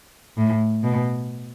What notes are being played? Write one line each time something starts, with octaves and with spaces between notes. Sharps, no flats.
A2
B2